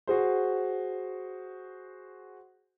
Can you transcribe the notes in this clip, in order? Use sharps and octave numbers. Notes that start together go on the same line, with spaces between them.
F#4 G#4 C5